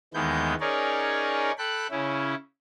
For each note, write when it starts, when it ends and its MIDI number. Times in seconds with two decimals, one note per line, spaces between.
0.14 0.54 39
0.14 0.54 51
0.14 0.54 52
0.14 0.54 56
0.14 0.54 59
0.14 0.54 91
0.60 1.51 61
0.60 1.51 63
0.60 1.51 68
0.60 1.51 70
0.60 1.51 73
0.60 1.51 74
1.58 1.87 69
1.58 1.87 79
1.58 1.87 83
1.58 1.87 90
1.91 2.35 49
1.91 2.35 61
1.91 2.35 64